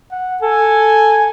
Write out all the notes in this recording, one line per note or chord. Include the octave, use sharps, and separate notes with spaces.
F#5
A4 G#5